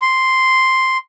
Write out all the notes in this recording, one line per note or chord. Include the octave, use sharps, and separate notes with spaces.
C6